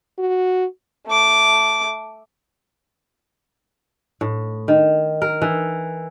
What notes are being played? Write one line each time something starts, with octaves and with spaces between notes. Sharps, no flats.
F#4
A3 D6
A2
D#3
A#4
E3